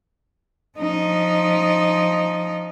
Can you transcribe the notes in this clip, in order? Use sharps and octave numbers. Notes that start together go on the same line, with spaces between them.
F3 D#4